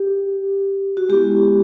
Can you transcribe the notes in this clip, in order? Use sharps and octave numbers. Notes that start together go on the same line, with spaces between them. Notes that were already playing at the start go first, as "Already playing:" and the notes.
Already playing: G4
F#4
G#3 B3 E4 G4